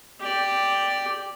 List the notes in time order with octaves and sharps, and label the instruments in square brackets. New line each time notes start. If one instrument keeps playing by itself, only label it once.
[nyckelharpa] G4 D5